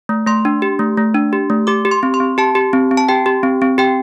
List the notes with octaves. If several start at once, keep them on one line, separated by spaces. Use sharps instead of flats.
A3
A3 C6
D4
G4
A3
A3
D4
G4
A3
G4 D6
G4
C6
C4
C6
C4
G4 A5
G4
C4
C4
A5
G4 G5
G4
C4
C4
G4 G5